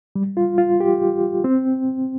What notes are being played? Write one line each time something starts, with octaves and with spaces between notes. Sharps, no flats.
G3
F4
F4
G4
C4